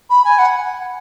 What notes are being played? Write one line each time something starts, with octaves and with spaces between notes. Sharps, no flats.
B5
G#5
F#5